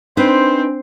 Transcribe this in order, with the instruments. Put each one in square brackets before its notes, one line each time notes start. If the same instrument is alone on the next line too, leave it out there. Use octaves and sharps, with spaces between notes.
[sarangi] C4 [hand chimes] D4 [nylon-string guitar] D#4 B4 [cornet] C5